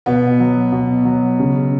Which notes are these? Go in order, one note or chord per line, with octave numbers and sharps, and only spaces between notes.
B2 B3
F#3
B2
F#3
C#3